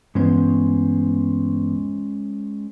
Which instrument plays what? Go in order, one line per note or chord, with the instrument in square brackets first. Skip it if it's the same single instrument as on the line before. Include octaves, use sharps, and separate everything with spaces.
[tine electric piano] G2 E3 B3 [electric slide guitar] G#3 C#4 C5